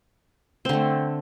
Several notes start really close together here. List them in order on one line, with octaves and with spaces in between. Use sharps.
C4 D3 A3